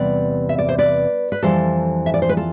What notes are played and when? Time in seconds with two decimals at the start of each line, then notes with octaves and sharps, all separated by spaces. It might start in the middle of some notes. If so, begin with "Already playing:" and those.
Already playing: E2 C3 G3 B4 D5
0.49 E5
0.58 D5
0.69 C5
0.78 B4 D5
1.32 B4
1.43 F2 E3 G3 A4 C5
2.06 E5
2.14 D5
2.22 C5
2.29 B4
2.37 F4 A4